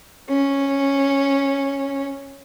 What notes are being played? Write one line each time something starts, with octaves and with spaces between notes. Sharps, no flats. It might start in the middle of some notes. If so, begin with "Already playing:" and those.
C#4